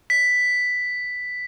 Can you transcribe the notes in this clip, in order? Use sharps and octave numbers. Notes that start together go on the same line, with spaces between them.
B6